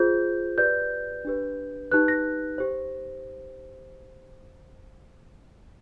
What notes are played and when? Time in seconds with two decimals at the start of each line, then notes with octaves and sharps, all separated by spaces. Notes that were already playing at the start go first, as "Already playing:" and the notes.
Already playing: F4 G#4 C5 G6
0.58 G4 B4 D5 G6
1.25 D4 G4 B4
1.92 D#4 G4 B4 F#6
2.08 A#6
2.58 G4 C5